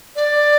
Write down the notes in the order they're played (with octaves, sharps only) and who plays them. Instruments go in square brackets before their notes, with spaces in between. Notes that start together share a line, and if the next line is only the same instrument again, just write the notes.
[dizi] D5